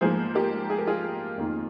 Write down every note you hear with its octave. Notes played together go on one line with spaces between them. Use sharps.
G#2 F3 A#3 G#4 C5
G4 A#4
G#4
A#4
F4 G#4
F2 D#3 A#3